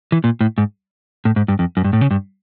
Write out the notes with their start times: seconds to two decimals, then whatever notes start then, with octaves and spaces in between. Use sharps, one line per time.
0.12 E3
0.24 A#2
0.41 A2
0.58 G#2
1.25 A2
1.36 G#2
1.48 G2
1.59 F2
1.77 F#2
1.84 G2
1.93 A2
2.01 C#3
2.11 G2